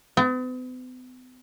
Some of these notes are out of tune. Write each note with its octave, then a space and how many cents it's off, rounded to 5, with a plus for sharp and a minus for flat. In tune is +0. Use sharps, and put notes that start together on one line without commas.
B3 +45